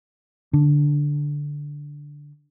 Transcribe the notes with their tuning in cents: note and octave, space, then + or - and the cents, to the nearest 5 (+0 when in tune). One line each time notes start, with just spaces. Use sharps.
D3 -5 D4 +0